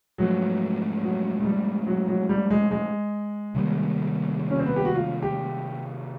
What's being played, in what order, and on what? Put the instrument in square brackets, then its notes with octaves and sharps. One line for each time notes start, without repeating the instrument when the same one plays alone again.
[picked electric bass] G#2 F3 A3 [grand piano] F#3
[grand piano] F#3
G#3
G3
F#3
F#3
G3
G#3
G#3
[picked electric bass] C3 D#3 G3 A#3
[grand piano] C#4
C4
B3
G4
F#4
F4
G4